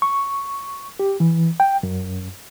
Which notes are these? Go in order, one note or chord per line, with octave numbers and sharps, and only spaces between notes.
C#6
G4
E3
G5
F#2